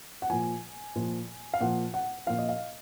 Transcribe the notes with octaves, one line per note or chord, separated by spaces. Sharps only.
F#5
A#2 F3 G#5
A#2 F3
F5
A#2 F3 F#5
F#5
A#2 F3 F5
D#5
F5